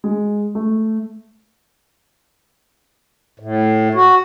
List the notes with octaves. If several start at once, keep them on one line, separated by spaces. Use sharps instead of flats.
G#3
A3
A2
F#4